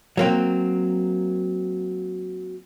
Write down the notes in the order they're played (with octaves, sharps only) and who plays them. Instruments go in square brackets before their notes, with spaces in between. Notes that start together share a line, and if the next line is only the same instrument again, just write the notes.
[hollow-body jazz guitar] F#3 A#3 C4